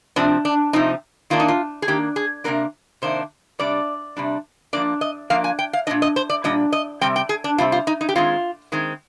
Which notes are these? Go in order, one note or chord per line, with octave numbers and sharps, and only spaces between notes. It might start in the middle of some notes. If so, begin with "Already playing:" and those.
C3 F3 C4 D4
D4
C3 F3 C4 D#4
D#3 A#3 D4 F4
D#4
F4
G#4
D#3 A#3 D4 G4
G#4
C3 D#3 A#3 D4 A#4
C3 D#3 A#3 D4 C5
C3 G3 D4 D5
C3 G3 D4
F3 A#3 D4 D5
D#5
F3 A#3 D4 F5
G#5
G5
F5
A#2 G3 D4 D#5
D#5
C5
D5
A#2 G3 D4 D#5
D#5
C3 G3 C4 G5
G5
G#4
D4
C3 G3 C4 F4
F4
D#4
D#4
G4
D#3 G#3 C4 F4
D#3 G#3 C4